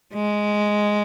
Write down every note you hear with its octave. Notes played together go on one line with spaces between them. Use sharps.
G#3